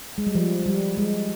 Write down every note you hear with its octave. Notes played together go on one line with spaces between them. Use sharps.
G#3
G3
F3
G3
G#3